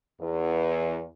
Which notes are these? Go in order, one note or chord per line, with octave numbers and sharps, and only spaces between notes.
E2